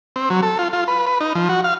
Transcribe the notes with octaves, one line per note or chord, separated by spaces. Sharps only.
C4
F#3
A4
F4
F4
B4
B4
D#4
F3
F#4
F5